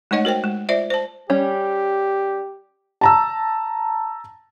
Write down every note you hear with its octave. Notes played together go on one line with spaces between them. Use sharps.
G#3 A3 D#4 C#5 D#5 F#5
F#4 A#4 C5 G5
G#3
F4 C5 D5 E5
C5 A5
G3 C#4 G4
A5 A#5 E6